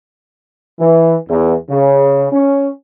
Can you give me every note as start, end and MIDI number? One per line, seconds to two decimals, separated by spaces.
0.80 1.16 52
1.29 1.54 40
1.70 2.26 49
2.32 2.69 61